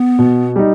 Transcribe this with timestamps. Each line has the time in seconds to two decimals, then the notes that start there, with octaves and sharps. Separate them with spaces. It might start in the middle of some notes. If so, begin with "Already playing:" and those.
Already playing: B3
0.19 B2
0.56 G3 D#4